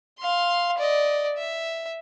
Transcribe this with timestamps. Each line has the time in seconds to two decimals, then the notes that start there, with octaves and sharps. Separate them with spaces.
0.19 F5 C6
0.78 D5 D#5
1.37 E5